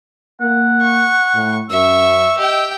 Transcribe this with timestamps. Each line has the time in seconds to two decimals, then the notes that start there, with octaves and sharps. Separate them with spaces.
0.41 A#3 F#5
0.81 C#6
1.34 A2
1.70 F#2 E5 C#6 E6
2.38 G4 D#5 G5